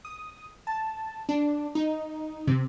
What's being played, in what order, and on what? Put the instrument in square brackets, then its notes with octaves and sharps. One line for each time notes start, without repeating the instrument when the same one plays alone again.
[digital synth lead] D#6
A5
D4
D#4
C3